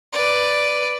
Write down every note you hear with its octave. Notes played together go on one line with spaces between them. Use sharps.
B4 D5